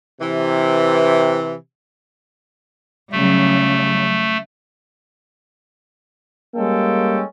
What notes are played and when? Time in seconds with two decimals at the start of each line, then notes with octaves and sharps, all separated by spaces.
0.21 C3 E3
3.12 C#3 F#3 G3 A3
6.55 G3 G#3 A#3 C#4 A4 G5